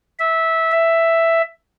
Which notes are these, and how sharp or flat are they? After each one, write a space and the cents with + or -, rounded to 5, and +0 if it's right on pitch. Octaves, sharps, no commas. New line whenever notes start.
E5 -15
E5 +5